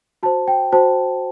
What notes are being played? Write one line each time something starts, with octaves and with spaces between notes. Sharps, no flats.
F#4 C5 A5
G5
F#4 C5 A5